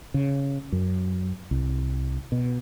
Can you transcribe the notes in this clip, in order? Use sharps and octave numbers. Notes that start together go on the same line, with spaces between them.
C#3
F#2
C2
B2